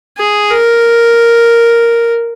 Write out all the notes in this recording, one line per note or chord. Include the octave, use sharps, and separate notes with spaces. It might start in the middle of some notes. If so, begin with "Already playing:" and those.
G#4
A#4